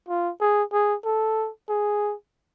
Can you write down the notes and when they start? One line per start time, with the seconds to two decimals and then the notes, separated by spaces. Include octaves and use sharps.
0.08 F4
0.41 G#4
0.72 G#4
1.05 A4
1.69 G#4